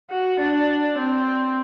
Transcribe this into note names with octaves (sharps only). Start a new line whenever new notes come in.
F#4
D4
C4